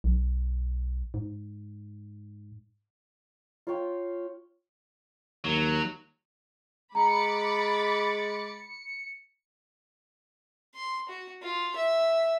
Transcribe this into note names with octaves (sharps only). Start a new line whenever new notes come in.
B1
G#2
F4 C#5 G5
D#2 F#3
G#3 A#5 B5 D6 A6 C#7
C6
F#4
F4
E5